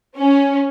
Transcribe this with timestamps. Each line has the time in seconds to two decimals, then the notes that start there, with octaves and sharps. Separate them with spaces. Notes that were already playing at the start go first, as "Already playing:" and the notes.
0.17 C#4